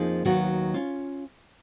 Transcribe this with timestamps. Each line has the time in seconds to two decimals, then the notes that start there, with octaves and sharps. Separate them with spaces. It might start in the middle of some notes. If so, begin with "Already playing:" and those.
Already playing: F2 F3 A#3 D#4 G#4
0.25 D#2 D#3 F#3 B3 F#4
0.74 C#4 F4